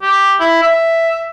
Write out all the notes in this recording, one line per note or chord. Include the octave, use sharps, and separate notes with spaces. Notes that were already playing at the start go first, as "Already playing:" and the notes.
G4
E4
E5